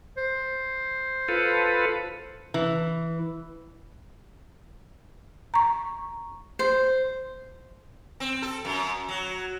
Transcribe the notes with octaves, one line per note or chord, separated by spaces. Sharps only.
C5
F4 A4 B4
E3
A#5 C#6
C5
C4
A4
F#2
F#3